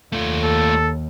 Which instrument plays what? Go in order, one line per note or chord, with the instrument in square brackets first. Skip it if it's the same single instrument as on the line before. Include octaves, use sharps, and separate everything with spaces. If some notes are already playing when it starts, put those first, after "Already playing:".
[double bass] D#2 [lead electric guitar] A3 F4
[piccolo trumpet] A4